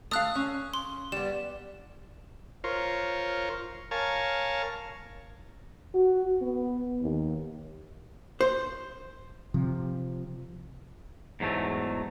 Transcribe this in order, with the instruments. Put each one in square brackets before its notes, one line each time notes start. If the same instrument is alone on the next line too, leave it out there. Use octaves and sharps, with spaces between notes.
[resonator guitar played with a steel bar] A3 F5 [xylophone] D#6 F#6
[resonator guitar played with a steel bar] C#4
[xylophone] C6
[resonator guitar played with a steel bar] G3 B3 [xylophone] E7
[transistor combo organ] F4 A#4 C5 C#5
A#4 C#5 F5 G#5 A5
[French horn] F#4
B3
D#2
[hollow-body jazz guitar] C5
[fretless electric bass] C3 F3
[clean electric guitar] E2 G#2 F#3 A3